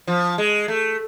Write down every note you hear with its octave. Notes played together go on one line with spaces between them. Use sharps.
F3
G#3
A3